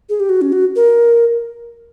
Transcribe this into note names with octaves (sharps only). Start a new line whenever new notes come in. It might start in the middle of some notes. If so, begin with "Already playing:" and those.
G#4
G4
F#4
C#4
F#4
A#4